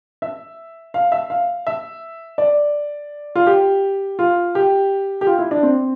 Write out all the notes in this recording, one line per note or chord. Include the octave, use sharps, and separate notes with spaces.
E5
F5
E5
F5
E5
D5
F4
G4
F4
G4
G4
F4
E4
D4
C4